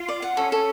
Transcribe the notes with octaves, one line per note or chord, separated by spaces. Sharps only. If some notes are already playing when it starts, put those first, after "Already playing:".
Already playing: F4
D5
F#5
C#4 A4
A4